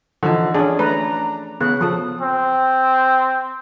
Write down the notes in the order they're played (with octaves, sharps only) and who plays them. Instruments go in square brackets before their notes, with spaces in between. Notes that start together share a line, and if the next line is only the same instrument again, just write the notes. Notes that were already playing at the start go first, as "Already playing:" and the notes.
[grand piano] D3 [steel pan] E3 F3 D#4
[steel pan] C#4 G#4 [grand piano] D4
[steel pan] A3 B4 [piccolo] A#5
[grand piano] C#3 [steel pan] B3 [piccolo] F#6
[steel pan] F3 A4 [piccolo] D#6
[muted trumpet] C4